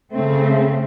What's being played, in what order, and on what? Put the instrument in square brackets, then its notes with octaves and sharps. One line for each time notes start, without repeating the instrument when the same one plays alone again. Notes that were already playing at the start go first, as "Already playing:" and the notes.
[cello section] C#3 A3 C4